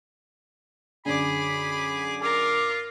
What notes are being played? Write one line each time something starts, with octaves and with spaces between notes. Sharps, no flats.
F#2 D3 G#4 B5 D6
F4 A#4 D6